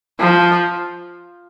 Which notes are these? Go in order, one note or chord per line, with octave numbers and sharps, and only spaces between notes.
F3